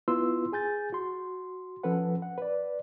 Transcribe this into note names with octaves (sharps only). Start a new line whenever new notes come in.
B3 E4 F4 B4 C6 E6
G#4 G#5 G6 A6
F#4 C6
F3 C#4 A4 B4 F#5
F#5
B4 D5